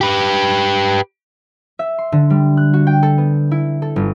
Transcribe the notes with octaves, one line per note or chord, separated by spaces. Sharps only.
G4 B4
E5
C6
D3
G3
F#6
F#4
G5
A4
B3
E4
A4
G1